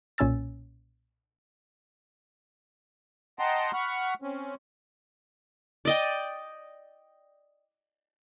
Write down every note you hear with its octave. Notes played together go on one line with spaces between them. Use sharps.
B1 A#2 C#4 G#5 E6 A6
D#5 F#5 G5 A5 A#5 C6
F#5 B5 C#6 F6
C4 C#4
D5 D#5 G5